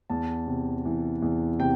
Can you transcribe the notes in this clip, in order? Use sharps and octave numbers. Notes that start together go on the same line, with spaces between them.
E2 A5
C3
E3
E2
C3 G5